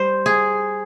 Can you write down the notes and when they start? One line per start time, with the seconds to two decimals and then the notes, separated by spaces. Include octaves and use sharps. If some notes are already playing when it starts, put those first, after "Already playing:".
Already playing: G3 C5
0.26 G#4